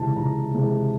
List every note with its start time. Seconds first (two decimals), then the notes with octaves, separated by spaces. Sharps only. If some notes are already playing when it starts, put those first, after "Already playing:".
Already playing: C#2 C3 E3 G#3 A5
0.16 C#2 A#5
0.54 C3 E3 G#3